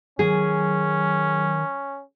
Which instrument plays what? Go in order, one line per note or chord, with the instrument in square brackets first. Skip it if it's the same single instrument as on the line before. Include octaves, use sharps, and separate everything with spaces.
[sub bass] D#3 [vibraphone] F#3 [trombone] C#4 [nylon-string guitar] G#4